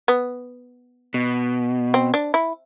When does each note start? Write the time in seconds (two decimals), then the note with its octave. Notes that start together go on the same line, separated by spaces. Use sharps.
0.08 B3
1.14 B2
1.94 C4
2.14 D4
2.34 E4